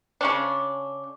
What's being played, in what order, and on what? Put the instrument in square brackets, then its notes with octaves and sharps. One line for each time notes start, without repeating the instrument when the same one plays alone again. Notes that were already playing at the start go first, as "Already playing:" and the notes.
[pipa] C#3 C#4 D4